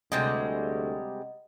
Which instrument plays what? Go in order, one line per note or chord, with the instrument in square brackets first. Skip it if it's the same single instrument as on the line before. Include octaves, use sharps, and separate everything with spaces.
[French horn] D2 [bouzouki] C3 G3 G#3 [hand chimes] D#5 F#5